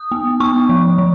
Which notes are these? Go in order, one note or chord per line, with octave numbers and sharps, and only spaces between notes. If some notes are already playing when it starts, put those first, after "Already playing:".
Already playing: D#6
B3
B3 C#6
F3
F3